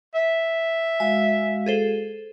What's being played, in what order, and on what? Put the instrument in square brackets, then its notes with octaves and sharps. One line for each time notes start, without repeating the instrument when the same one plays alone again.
[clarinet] E5
[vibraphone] G#3 F#4 F5 [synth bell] G#5
[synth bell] G#4 A4 C5